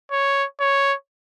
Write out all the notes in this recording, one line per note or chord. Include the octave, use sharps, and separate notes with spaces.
C#5
C#5